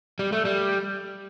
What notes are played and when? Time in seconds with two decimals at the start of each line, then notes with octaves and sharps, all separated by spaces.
0.19 G3
0.32 A3
0.45 G3